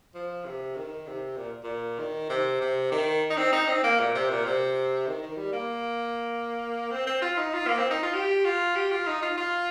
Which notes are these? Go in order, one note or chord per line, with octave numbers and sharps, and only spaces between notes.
F3
C3
D#3
C3
A#2
A#2
D#3
C3
C3
D#3
D#4
C4
D#4
C4
A#3
A#2
C3
A#2
C3
D#3
D#3
G3
A#3
C4
C4
F4
D#4
F4
A#3
C4
D#4
F4
G4
F4
G4
F4
D#4
F4
F4